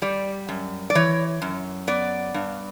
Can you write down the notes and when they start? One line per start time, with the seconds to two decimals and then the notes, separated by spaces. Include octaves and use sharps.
0.02 G3 D5
0.48 F#2
0.90 D5
0.95 E3 C#5
1.42 F#2
1.87 B3 D5
2.34 G2